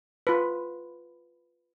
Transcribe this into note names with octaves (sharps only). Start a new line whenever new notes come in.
F4 B4